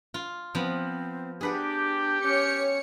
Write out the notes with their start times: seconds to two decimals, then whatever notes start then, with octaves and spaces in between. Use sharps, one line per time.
0.14 F4
0.55 F3 B3 C4
1.41 D4 G4 G#4 B4 F#5
2.24 C#4 C#5 C#7